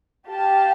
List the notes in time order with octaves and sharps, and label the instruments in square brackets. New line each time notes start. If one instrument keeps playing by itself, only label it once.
[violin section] G4 F5 A5